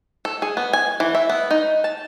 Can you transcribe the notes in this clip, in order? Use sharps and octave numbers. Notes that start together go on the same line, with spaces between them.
A4
G#4
B3
G#5
E3
E5
B3
D#4
A5